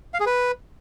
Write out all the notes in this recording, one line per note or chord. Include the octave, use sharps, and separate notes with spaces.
F5
G#4
B4